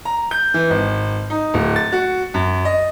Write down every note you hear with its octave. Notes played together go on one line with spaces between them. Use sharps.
A#5
G6
E3
G#1
D#4
D1
A6
F#4
F#2
D#5